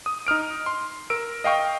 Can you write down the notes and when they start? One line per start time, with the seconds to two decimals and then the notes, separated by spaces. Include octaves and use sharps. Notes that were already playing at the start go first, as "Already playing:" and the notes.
0.06 D#6
0.27 D#4 D#6 F6 D7
0.66 C6
1.10 A#4 E6 D7
1.44 D#5 F5 G5 C#6